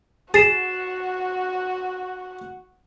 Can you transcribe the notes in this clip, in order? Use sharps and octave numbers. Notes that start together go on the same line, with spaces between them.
F#4 G#4 F#5 A6 C7 E7